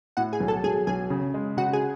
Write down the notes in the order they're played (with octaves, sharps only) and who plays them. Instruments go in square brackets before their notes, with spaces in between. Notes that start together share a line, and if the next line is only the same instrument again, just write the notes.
[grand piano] A2 [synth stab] F#4 F#5
[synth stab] G#4 G#5
[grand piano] B1
[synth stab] A4 A5
[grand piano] B1 [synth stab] G#4 G#5
[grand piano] B1 [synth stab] G#4 G#5
[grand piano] C#3
G#3
[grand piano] C#3 [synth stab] F#4 F#5
[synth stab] G#4 G#5